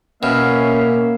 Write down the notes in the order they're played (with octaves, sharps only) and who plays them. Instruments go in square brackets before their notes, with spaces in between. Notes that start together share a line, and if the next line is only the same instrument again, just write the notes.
[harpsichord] B2 [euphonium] A#3 [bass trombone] C#4 [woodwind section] E5 F5